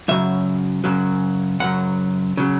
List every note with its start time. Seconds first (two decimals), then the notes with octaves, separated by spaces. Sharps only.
0.08 F#2 C#3 F#3 E5
0.84 F#2 C#3 F#3
1.60 F#2 C#3 F#3 F#5
2.37 C#3 F#3